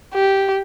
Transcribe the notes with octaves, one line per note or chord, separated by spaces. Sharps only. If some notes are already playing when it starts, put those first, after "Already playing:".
G4